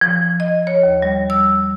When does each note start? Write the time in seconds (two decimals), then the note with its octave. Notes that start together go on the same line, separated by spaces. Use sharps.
0.01 F3
0.40 D#5
0.67 C#5
0.83 D#2
1.02 G3
1.30 E6